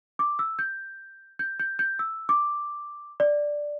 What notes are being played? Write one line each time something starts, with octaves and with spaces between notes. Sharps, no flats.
D6
E6
G6
G6
G6
G6
E6
D6
D5